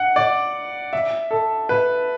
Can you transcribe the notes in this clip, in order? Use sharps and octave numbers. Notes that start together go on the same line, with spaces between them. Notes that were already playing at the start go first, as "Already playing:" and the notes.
Already playing: F#5
D5
E5
A4
B4